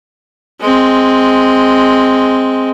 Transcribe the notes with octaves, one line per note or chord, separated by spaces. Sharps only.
G#3 C4